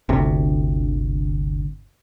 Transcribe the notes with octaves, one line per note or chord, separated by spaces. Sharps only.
G1 D2 C3